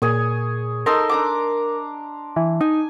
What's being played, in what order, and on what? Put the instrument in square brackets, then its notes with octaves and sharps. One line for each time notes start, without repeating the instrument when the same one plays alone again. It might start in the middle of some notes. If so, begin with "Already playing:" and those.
[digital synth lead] A#2 [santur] G#4 C#5
[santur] D#4 A4 C6 [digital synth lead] A#4
[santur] D4 A#5 D6
[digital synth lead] E3
[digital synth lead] D#4 [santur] G#5